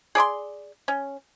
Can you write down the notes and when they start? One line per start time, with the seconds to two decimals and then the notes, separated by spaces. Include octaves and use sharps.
0.15 G#4 D5 B5 C6
0.88 C#4